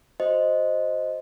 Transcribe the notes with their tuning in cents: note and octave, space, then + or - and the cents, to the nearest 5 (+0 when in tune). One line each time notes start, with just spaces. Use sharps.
F#4 +0 C5 +0 D#5 +0